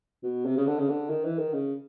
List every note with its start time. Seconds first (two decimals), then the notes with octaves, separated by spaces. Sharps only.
0.23 B2
0.45 C3
0.57 C#3
0.66 D3
0.78 C#3
0.89 D3
1.10 D#3
1.25 E3
1.39 D#3
1.54 C#3